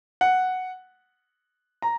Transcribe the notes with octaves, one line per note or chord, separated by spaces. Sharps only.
F#5
A#5